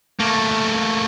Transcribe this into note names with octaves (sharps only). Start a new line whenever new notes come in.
A3 A#3